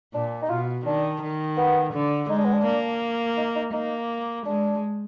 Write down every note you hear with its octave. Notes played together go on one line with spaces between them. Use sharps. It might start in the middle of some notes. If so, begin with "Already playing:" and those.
A#2 D4
D#4
B2 F4
D#3 D4
D#3
B3
D3
G#3 D#4
D4
B3
D4
A#3
D#4
D#4
A#3 D#4
G#3 D4